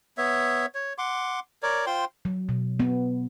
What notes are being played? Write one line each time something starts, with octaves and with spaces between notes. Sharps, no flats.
B3 C#5 E5
C#5
F#5 C6 D6
A#4 C#5 D5
F4 C5 G5 C6
F#3
B2
B3